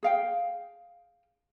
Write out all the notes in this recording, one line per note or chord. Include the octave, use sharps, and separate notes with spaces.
G#4 F5 G5